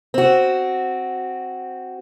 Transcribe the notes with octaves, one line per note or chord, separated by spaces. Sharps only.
C4 F#4